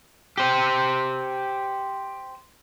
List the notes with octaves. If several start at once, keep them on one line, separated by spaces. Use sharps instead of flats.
G4 C5